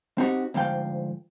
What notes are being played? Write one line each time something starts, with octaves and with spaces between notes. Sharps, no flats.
C4 D#4 F#4 G4
D2 G#2 F3 F5 G5